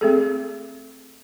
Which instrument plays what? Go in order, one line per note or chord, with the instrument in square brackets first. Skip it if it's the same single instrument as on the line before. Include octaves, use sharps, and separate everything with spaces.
[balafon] A3 C4 G#4 A4